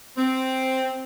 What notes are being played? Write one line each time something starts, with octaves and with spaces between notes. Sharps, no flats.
C4